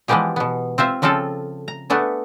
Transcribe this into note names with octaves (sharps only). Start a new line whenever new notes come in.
E3 F3 G#3 B3 G4 G#4
B2 B3
C4 F4 C5 E5
C#3 F3 C4 F4 A4
A#5
A3 B3 D4 G#4